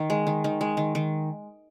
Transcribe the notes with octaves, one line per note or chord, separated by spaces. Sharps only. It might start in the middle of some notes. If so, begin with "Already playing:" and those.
Already playing: D#3
G#3
D#3
D#3
G#3
D#3
D#3